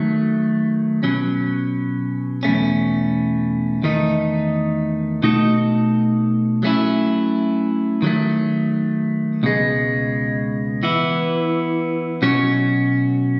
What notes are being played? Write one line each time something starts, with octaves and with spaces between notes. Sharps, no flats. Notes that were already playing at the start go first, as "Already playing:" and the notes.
Already playing: D#3 F#3 A3
B2 F#3 C#4
E2 B2 A3 C#4
E2 D#3 A3 D#4
B2 A3 D#4 F#4 A4
F#3 A3 C#4 E4
D#3 F#3 A3
C#2 B2 G#3
E3 B3 E4
B2 F#3 C#4 F#4 C#5